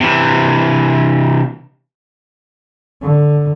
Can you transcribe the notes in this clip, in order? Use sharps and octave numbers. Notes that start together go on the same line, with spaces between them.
C3 E3
D3